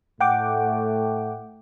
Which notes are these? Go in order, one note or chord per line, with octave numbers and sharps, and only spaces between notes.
A2 A3 F#5 G5 D6